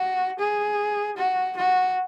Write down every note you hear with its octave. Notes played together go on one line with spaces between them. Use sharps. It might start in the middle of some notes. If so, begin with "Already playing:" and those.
Already playing: F#4
G#4
F#4
F#4